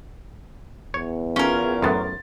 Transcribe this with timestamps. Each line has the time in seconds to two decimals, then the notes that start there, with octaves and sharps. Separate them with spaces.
0.94 E2 C#5
1.36 E3 C#4 F4 A#4
1.82 F#2 A2 B3 C6 A6